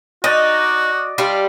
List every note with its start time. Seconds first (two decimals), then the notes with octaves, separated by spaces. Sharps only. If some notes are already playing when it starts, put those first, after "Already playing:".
0.24 D#4 F#4 D5 D#5
1.18 G3 D4 F4